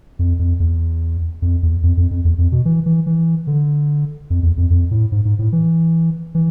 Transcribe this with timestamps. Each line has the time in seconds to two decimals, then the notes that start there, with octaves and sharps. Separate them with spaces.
0.19 F2
0.39 F2
0.60 E2
1.42 F2
1.63 E2
1.83 F2
1.97 F2
2.11 F2
2.25 E2
2.38 F2
2.52 B2
2.65 E3
2.86 E3
3.06 E3
3.47 D3
4.30 F2
4.43 E2
4.57 F2
4.70 F2
4.91 A2
5.12 G#2
5.25 G#2
5.39 A2
5.52 E3
6.35 E3